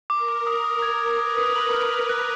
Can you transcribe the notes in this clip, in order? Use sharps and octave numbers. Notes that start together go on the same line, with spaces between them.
A#4 D6
D6
A#4 D#6
D#6
G#6
G#6
B4 D#6
D#6
F#7
F6
F7
F#6